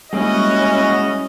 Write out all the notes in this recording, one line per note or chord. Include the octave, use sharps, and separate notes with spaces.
G3 G#3 A#3 C#4 E4 F#4 G#4 D#5